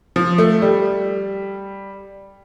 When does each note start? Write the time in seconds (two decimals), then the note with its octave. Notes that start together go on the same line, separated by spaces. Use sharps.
0.16 F3
0.38 A3
0.62 G3